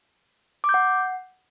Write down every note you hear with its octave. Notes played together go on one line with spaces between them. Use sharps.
D6
G6
F#5